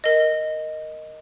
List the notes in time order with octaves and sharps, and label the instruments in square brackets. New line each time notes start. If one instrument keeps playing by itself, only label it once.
[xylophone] A#4 D#5